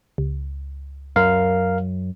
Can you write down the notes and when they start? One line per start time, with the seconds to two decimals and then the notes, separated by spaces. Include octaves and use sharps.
0.18 C#2
1.16 F#2 A#4 F5